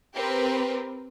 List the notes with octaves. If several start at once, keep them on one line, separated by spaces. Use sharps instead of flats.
C4 G4 A#4 B4